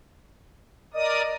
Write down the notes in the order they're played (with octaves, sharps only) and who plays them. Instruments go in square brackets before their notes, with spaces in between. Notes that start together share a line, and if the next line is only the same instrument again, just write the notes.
[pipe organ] A#4 D5 D#6 [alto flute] D#5